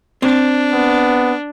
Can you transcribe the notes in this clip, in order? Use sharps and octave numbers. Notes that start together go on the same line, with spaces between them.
C4 D4
B3